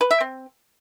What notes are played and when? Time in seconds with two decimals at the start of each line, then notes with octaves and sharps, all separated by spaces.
0.01 B4
0.11 E5
0.20 C4